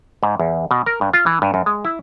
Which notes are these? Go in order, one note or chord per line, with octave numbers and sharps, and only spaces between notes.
G#2
E2
B2
A#4
G2
F4
E3
G2
F#2
G#3
E4